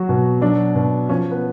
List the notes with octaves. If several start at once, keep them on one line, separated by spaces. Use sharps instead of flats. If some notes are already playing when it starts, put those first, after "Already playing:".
Already playing: F#3 F#4
B2
F#3 D4
B2
F3 C#4
B3